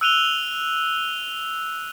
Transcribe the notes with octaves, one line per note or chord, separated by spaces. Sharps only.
E6 F#6 D#7 F7 G7